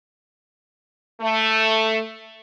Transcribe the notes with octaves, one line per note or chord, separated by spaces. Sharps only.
A3